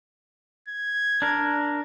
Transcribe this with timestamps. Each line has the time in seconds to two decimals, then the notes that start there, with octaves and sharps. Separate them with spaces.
0.68 G#6
1.22 D4 A#4